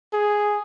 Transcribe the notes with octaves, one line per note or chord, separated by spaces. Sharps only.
G#4